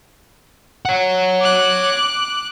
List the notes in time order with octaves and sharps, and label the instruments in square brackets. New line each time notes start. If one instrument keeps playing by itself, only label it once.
[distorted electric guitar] C#5 F#5
[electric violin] D6 F#6